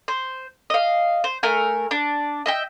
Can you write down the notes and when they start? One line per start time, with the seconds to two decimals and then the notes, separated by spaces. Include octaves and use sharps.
0.08 C5
0.70 D#5 F5
1.24 C5
1.43 A3 A#4 G#5
1.91 D4
2.46 D#5 E5 G5